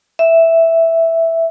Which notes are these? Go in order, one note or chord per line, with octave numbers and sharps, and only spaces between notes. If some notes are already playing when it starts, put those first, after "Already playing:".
E5